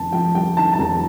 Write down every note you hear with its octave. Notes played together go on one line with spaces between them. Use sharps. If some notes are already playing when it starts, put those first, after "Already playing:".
Already playing: F1 D#3 A5
F2 G5
G3 G5
D#3 A5
A5
F1 A#5